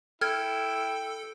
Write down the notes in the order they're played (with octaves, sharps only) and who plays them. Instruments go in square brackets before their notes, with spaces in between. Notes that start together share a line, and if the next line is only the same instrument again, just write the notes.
[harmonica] E4 [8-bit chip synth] A4 [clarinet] G5 [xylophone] F6 G#6